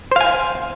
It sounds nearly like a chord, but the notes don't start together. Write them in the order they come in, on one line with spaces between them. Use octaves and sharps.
C5 F5 G#5